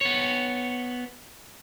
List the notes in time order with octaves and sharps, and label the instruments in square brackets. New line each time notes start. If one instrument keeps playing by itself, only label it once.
[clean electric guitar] B3 C#5